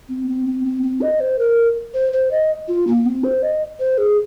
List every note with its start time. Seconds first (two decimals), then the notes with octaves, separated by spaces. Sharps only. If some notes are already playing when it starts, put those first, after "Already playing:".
0.09 C4
0.28 C4
0.46 C4
0.65 C4
0.83 C4
1.01 D#5
1.20 C5
1.39 A#4
1.94 C5
2.13 C5
2.31 D#5
2.68 F4
2.87 A#3
3.06 C4
3.24 C5
3.43 D#5
3.79 C5
3.98 G#4